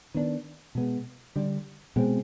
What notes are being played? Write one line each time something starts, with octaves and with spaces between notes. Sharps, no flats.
D#3 B3 D4
B2 G#3 B3
D3 G3 D4
B2 G#3 C4